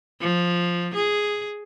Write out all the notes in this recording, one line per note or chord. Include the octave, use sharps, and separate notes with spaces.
F3
G#4